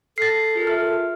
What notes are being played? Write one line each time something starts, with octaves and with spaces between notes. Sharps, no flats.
A4 F6 A6 A#6 C7
F4 G#4 A#4
F4 E5 F6